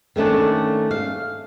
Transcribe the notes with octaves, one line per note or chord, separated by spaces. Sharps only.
D#3 A3 C#4 D4
F5